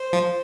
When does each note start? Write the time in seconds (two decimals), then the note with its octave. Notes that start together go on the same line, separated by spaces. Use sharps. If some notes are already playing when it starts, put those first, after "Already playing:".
Already playing: C5
0.13 F3